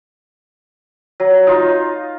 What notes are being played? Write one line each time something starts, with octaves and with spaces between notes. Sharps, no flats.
F#3
D#4 F4